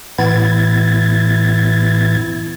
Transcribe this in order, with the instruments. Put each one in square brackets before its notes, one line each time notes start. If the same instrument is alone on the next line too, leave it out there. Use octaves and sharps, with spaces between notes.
[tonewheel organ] A2 E3 B3 E4 G#6 A6